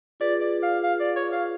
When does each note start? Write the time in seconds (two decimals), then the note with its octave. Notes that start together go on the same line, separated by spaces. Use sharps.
0.20 F4 G#4 B4 D5
0.41 D5
0.63 F5
0.83 F5
1.00 D5
1.16 C#5
1.32 F5